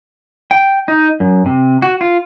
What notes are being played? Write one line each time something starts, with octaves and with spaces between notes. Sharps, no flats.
G5
D#4
F#2
C3
F#4
F4